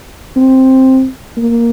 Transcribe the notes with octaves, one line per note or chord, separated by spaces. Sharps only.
C4
A#3